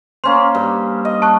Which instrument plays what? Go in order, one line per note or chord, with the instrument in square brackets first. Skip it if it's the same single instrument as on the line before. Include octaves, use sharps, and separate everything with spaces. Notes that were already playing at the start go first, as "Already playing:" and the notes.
[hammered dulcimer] A#3 C#4 C5 [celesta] C6
[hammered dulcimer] G2
D#5
[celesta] A5 C#6 F#6